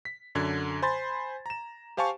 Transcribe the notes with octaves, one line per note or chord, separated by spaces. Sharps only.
B6
F#2 D3 G#6
C5 G#5 B5 C6 A6
A#5 E7
G4 C5 F5 G#5 A5 C#6